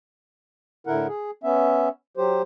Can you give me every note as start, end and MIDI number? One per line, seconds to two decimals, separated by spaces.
0.87 1.07 45
0.87 1.07 50
0.87 1.07 64
0.87 1.07 70
0.87 1.07 78
1.07 1.31 68
1.43 1.89 59
1.43 1.89 61
1.43 1.89 76
2.17 2.42 54
2.17 2.42 67
2.17 2.42 72